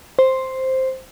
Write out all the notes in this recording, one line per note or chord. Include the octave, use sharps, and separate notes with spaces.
C5